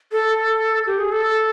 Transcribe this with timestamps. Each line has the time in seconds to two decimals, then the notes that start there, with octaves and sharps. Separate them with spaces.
0.12 A4
0.87 G4
1.00 G#4
1.12 A4